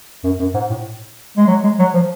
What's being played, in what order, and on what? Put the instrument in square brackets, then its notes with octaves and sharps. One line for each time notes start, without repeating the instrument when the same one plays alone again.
[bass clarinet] F#2
F#2
G#2
A2
G#3
F#3
G#3
F#3
F3